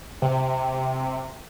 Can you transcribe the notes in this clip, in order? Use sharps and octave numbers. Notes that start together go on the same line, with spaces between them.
C3